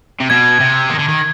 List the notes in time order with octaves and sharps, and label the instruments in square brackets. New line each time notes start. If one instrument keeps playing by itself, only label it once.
[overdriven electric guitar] C3
[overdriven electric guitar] B2 [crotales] G#6
[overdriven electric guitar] C3
D#3
D3
D#3